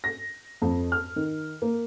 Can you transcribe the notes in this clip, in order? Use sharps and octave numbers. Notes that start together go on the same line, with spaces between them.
A#6
F2
F6
D#3
A#3